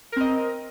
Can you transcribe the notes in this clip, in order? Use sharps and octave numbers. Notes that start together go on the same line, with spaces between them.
C4 A#4 D#5